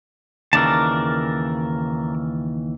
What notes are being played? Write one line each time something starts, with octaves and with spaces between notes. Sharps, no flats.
D#2 C#3 E3 A#4 D5 A5